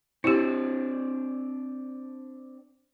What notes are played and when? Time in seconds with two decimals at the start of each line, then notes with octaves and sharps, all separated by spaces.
0.24 C4 D4 E4 G4